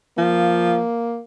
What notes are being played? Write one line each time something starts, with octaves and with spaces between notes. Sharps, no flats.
F3 A#3